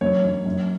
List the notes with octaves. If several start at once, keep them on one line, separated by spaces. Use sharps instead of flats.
F#2 C#5
F#2
F#2